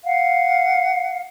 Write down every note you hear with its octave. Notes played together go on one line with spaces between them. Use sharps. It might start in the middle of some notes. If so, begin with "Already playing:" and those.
F5 F#5